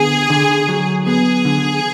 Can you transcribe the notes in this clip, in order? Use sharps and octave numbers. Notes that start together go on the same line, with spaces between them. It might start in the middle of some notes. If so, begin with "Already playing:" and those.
Already playing: D3 B3 G#4
D3
F#3
B3 G#4
D3